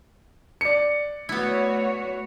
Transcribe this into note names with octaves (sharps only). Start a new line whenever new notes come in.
D5 C#7
A3 B3 E4 F#4 C#5